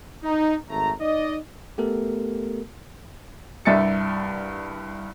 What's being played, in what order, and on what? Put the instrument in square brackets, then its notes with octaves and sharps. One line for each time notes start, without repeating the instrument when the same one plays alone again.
[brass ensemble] D#4
G#1 A3 A#5
D#4 D5 D#5
[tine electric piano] A3 B3 G4 A4 A#4
[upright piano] C2 G2 E5 A6 C#7